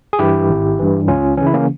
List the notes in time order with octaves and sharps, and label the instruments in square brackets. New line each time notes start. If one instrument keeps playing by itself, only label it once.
[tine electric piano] G#4
G2 E3 E4 G4
G#1
G2 E3
C#2 C#4 F4
E3 C#4
C#3
E4
A#3 C#4